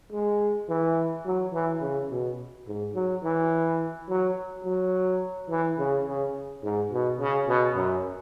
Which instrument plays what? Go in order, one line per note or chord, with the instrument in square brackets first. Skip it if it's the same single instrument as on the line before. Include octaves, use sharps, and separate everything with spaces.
[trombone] G#3
E3
F#3
E3
C#3
B2
G#2
F#3
E3
F#3
F#3
E3
C#3
C#3
G#2
B2
C#3
B2
F#2